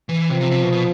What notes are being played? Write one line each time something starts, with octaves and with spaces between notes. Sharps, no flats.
E3
C3 F3
C3
C3
B2
B2